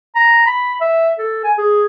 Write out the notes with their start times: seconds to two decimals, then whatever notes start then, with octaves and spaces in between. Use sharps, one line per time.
0.16 A#5
0.47 B5
0.81 E5
1.19 A4
1.44 G#5
1.58 G#4